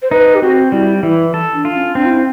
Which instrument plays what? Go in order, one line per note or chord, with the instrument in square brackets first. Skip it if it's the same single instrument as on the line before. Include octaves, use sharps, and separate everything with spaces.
[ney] C5
[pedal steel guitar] D#4 [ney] B4
[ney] G4
[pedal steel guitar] C4 [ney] F#4
[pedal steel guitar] G3 [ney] E4
[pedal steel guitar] E3 [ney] E4
[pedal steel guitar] A4
[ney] D4
[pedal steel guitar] F4
[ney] C#4
[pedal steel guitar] C4 [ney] D4
[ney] F4
E4